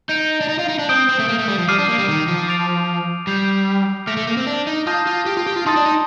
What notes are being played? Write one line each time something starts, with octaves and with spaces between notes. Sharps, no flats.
D#4 G6 D7 F7
D4
D#4
F4
D#4
D4
C4 D#6 G6 D7 G7
C4
A3
A#3
A3
G3
F3
G3 D6 F6 C7 D#7
D4
A#3
G3
D#3
F3
D6 A6 D7 F7
G3 G6 C7 F7
A3 D6 F6 A#6 D7 F7
A3
A#3
C4
D4
D#4
F4 A5 D#6 G6 A#6
F4
G4
F4
G4
F4
D#4 A5 C6 D#6 A6
D4
D#4